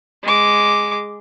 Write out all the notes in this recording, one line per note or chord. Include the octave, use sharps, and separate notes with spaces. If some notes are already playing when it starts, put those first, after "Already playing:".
G#3 D6